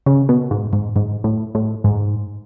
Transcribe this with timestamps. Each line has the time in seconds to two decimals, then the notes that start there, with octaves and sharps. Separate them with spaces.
0.06 C#3
0.29 B2
0.51 G#2
0.73 G#2
0.96 G#2
1.24 A2
1.55 A2
1.84 G#2